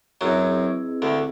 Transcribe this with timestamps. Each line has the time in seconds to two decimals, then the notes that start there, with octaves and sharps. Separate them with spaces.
0.21 F#2 F#3 C4 E4 G#4 B4 D#5
1.02 D2 D3